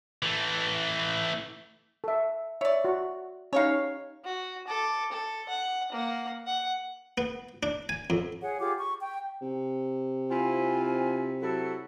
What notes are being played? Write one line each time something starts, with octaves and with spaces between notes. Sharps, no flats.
E3 A3
A4 E5
C#5 D5 E5
F#4
C#4 D#4 G4 C#5 F5
F#4
A4 D6
A4
F#5
A#3 F#5
F#5
B3
D4
G#5
F2
G#4 C#5 F#5
F4 G4 G#4 D6
C#6
G5
C3
C4 E4 F4 G#5
F#3 E4 F#4 A4